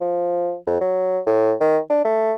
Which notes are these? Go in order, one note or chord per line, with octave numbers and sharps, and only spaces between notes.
F3
F2
F#3
A2
D#3
D4
A3